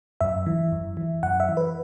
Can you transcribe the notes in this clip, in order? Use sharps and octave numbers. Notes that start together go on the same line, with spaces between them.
F#2 E5
E3
F#2
E3
F#2 F#5
E5
E3
B4